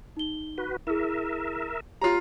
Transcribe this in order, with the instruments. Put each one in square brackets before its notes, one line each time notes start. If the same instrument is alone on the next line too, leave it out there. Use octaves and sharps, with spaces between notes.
[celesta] D#4 G7
[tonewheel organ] F#4 B4
[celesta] E4 G#4 [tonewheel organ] A#4 E5
[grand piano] F4 A#5 [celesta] G4 C#5